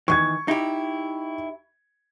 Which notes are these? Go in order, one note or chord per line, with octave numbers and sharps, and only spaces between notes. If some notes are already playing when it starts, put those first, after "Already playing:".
D#3 E3 C#6 G#6
D#4 E4 G4